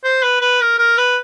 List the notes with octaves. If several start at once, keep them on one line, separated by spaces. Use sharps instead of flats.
C5
B4
B4
A#4
A#4
B4